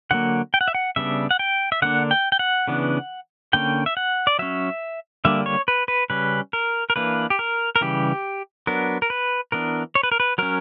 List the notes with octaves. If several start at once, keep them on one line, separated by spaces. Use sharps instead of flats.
D3 F#3 A#3 F#5
G5
F#5
E5
F#5
C#3 G3 B3 D4 E5
F#5
G5
E5
D3 A#3 D4 F#5
G5
G5
F#5
C#3 E3 B3 D4
D3 A#3 C#4 G5
E5
F#5
D5
F#3 C#4 E5
D3 G3 A#3 D4 E5
C#5
B4
B4
C#3 G3 C#4 B4
A#4
A#4
E3 A#3 D4 B4
G4
A#4
A#4
C#3 E3 G3 G4
F#3 B3 D4 A#4
A#4
B4
E3 B3 D4 A#4
C#5
B4
A#4
B4
F#3 C#4 A#4